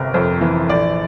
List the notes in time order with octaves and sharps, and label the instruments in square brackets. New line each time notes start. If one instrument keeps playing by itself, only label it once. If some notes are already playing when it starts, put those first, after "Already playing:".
Already playing: [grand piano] G1 C3 A#4
F2 C5
E3
A#1 D5